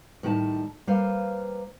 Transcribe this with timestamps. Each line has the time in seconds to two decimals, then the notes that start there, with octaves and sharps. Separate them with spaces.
0.23 A2 D#3 G3 G#5 A5
0.87 G3 A#3 B4 C5 F5